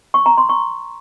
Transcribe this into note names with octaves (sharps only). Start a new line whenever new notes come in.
C#6
A#5
C6
C#6